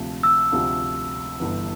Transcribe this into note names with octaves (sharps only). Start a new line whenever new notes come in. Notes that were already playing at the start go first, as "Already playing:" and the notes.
Already playing: D2 C3 F3 A3
E6
D2 C3 F3 A3
G1 G2 E3